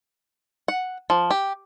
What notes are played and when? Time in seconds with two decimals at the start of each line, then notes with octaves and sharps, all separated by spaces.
0.68 F#5
1.10 F3
1.31 G4